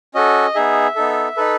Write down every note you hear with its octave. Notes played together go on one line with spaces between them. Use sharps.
C#4 F#4 A4 D#5
B3 D#4 G#4 E5
B3 D#4 A4
D#4 A4 B4